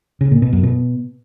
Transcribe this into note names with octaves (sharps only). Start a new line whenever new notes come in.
C#3
A#2
B2
F#2
B2